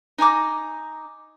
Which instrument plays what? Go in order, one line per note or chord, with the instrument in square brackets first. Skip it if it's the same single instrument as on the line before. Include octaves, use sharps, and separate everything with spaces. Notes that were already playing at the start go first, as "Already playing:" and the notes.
[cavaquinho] D#4 G#5 A#5 D6